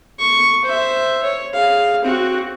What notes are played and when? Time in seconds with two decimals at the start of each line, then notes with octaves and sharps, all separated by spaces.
0.20 C#6
0.65 C5 E5
1.23 C#5
1.53 G#4 F5
2.02 C4 F#4